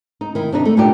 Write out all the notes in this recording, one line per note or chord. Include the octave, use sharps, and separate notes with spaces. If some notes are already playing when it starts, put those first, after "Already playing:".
D#4
D#3 E4
C3 D4 D#4
A3
A#2 D3 D4 D#4 G4